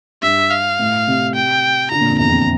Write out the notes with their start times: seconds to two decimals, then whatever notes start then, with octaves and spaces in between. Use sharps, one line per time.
0.22 G2 E5
0.51 F5
0.79 A2
1.07 C3
1.36 G5
1.91 D3 A#5
2.01 A#2
2.10 F2
2.19 E2 A#5
2.29 F2